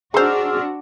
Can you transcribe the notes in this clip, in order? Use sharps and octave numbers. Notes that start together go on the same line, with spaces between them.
D4 D#4 F#4 G#4 C5 C6 E6 F6